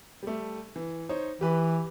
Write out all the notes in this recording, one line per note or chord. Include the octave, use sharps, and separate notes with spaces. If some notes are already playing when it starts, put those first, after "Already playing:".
G3 A3
E3
D#4 C5 C#5
E3 G4 B4